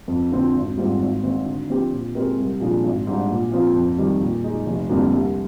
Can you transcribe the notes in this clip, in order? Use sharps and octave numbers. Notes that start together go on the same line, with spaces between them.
F2
D3 F3 C4
G#1
G#2 G3 C4 F4
G#1
G#2 D#3 G#3 C4
D3
F3 C4 G4
A#2
G#3 C4 G4 A#4
C2
A#2 F3 G#3 D4
G#1
G#2 G3 D4
A#2
F3 C4 F4
F2
D#3 G3
A#2
G#3 D#4
F1
F2 D3 G3 A#3
C2